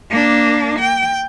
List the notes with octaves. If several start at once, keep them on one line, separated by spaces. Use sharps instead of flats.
A#3 D4
G5